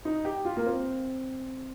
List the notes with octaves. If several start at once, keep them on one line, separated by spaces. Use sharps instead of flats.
D#4
G4
F4
A#3
C4